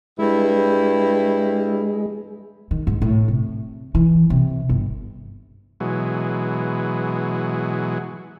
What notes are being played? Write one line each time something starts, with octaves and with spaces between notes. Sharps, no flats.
G2 G#3 E4
D#3
G#2
A2
C3
E3
C3
G1
B2 E3 F#3 G#3